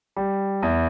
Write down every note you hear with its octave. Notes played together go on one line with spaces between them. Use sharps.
G3
E2